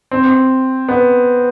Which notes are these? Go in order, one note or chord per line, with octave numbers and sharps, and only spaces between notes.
C4
B3